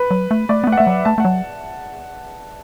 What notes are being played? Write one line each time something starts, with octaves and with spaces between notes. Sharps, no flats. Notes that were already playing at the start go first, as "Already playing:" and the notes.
Already playing: B4
F#3
A3
A3 D5
B3
A3
F#5
A3 E5
F#3
A3 A5
A3 F#5
F#3